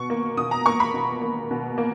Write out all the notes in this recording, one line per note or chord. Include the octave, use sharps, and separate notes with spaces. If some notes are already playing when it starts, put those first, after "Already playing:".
Already playing: B2 C#6
A#3
B2 D#6
A#5
A#3 C#6
B5
B2
A#3
B2
A#3